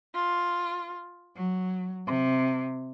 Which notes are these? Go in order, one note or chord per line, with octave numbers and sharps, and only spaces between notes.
F4
F#3
C3